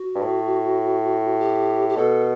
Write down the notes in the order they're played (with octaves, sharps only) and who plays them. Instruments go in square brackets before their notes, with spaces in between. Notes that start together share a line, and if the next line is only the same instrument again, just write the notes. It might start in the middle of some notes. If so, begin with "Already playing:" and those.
Already playing: [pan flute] F#4
[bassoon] G2
A2
[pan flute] G4
G4
[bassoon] B2 [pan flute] A4